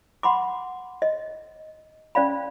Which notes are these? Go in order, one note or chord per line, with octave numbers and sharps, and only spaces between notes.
F#5 B5 C6 D6
D#5
C#4 D5 F5 B5